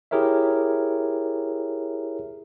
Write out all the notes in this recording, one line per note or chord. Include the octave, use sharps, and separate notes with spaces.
E4 G4 G#4 A#4 C#5 E5